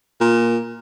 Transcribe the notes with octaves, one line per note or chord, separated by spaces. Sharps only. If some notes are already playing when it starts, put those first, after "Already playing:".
A#2